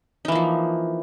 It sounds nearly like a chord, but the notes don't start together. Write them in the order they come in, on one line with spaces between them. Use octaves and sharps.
D#4 E3 A#3 F3